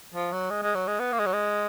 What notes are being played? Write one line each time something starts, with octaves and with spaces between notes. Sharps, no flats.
F3
F#3
G#3
G#3
F#3
G#3
B3
A#3
G#3
F#3
G#3